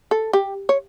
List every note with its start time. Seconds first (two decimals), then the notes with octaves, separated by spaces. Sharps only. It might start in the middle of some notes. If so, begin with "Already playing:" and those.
0.11 A4
0.33 G4
0.69 C#5